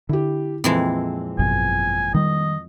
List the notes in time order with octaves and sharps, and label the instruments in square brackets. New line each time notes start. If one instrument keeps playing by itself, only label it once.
[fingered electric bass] D3 [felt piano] E4 G4
[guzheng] F2 E3 G#3 [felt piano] A#2 C4
[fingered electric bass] G#1 F#2 B2 [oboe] G#5
[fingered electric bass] D#3 G3 [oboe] D#5